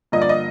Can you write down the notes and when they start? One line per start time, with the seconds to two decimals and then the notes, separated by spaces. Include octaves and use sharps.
0.12 G2 D3 F3 A#3 D#5
0.22 D5
0.29 D#5